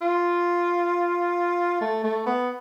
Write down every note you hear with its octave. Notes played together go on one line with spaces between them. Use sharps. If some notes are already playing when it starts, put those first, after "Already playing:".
F4
A3
A3
B3